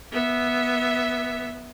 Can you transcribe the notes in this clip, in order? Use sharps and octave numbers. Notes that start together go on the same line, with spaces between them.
B3 E5